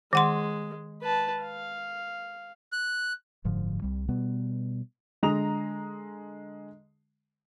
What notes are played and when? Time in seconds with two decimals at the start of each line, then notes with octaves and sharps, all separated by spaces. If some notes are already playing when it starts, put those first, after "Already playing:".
0.13 D#3 G#3 F#5 C6
1.03 B4 A5
1.43 F5
2.72 F#6
3.44 F#1 G#2 D3 F3
3.82 C2 G3
4.08 B2 G3 B3
5.23 D3 G#3 A#5 D#6 F7